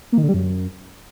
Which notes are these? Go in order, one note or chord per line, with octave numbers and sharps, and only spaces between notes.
A#3
D#3
D3
G3
F#2